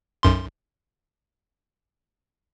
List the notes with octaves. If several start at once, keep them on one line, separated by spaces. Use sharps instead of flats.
B1 F#2 C6